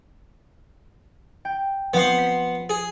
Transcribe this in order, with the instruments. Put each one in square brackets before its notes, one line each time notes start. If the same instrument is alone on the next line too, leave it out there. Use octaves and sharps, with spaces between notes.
[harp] G5
[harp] F3 C4 [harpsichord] B3 F#5 C6
[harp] B6
[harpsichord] G#4